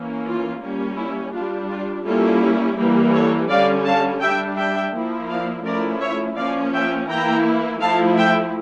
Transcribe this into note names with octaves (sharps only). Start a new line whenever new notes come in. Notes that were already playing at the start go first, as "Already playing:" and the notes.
Already playing: E3 A#3 C#4
F4
G3 A#3 C#4
E4
G3 D4 F4
F4
G3 A#3 C#4 E4 F4 A4
E3 G3 A#3
A4 C#5
D3 G3 C#4 D5 F5
F5 A5
G3 D4 E5 G5
E5 G5
F3 A#3 E4
D5 F5
F3 A3 C#4 E4 A#4 D5
C#5 E5
F3 A#3 C#4 D5 F5
E5 G5
E3 A#3 E4 G5 A#5
F3 A3 E4 F5 A5
E5 G5